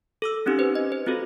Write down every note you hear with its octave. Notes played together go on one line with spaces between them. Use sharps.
A4 D6 E6
C4 C#4 D#4 G4
B4 C5
D#5
C5
C4 F4 F#4 A4